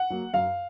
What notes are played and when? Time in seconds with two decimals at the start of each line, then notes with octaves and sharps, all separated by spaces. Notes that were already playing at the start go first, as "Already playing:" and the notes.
Already playing: F#5
0.10 F#3 A#3
0.34 F#2 F5